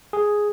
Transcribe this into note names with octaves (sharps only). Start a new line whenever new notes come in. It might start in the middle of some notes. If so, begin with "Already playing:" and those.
G#4